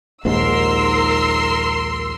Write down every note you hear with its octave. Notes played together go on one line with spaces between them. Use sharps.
A#1 D#2 G#2 A#4 C6 E6